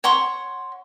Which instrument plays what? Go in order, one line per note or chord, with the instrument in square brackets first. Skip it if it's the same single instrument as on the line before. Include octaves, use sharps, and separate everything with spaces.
[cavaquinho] C#5 F#5 C6 C#6